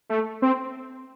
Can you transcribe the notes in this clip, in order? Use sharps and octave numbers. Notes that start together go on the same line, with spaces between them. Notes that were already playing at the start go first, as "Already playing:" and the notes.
A3
C4